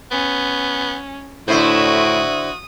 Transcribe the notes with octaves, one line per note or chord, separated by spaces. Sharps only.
B3 C#4
A2 D3 E4 F#4 C5 D#6